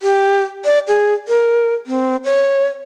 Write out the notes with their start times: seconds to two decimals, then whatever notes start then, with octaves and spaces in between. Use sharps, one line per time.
0.02 G4
0.65 D5
0.88 G#4
1.28 A#4
1.87 C4
2.24 C#5